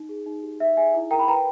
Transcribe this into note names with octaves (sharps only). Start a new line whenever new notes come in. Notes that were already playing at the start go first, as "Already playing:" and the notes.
Already playing: D#4
G#4
D#4
G4
D#4 E5
G#4 E5 G#5
E4
A#4 G5 A#5
B5
B4 G5 A#5